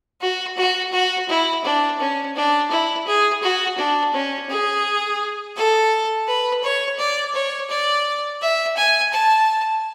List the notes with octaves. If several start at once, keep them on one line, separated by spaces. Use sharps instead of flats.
F#4
F#4
F#4
E4
D4
C#4
D4
E4
G#4
F#4
D4
C#4
G#4
A4
B4
C#5
D5
C#5
D5
E5
G#5
A5